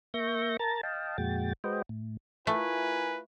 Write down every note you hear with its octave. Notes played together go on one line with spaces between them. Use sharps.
A#3 E5 C#6 G6 A#6
A#4 A5 A#5 A6
D#5 F5 G5 A5
F2 A#2 G#3 F#4 G5 A6
G#3 F#4 B4 C5 D#5 G5
A2
A3 E4 F4 A#4 B4 G#5